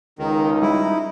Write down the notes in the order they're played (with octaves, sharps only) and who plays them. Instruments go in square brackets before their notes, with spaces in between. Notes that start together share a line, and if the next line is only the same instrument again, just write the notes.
[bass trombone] C#2 [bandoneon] D#3 [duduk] D#4
[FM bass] G3 [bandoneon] E4